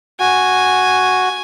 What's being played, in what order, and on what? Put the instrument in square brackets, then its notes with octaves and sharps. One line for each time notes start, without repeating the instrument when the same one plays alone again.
[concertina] F#4 [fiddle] G#5